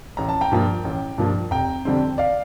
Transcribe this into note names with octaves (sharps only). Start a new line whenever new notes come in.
A1 A#5
A5
G5 A#5
G2 F3 A#3
A1
G2 F3 A#3
F1 G5 A#5
F2 D3 G3 C4
D5 F5